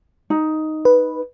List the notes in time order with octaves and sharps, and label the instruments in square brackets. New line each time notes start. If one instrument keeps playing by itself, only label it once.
[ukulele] D#4
[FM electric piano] B4